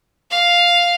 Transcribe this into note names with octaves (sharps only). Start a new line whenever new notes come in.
F5